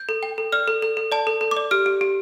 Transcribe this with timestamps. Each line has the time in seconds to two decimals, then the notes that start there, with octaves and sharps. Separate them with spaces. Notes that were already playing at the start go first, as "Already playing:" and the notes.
Already playing: G6
0.09 A4
0.23 G5
0.38 A4
0.52 D5 F6
0.68 A4
0.82 A4
0.97 A4
1.12 D5 A5
1.27 A4
1.41 A4
1.51 D6
1.57 D5
1.71 G4 F6
1.86 G4
2.01 G4